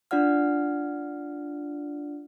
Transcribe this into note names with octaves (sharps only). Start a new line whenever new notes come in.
D4 F4 D5 F#5 F6